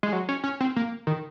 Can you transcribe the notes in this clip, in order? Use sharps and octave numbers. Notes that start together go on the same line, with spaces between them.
G#3
F#3
C#4
C#4
C4
A#3
D#3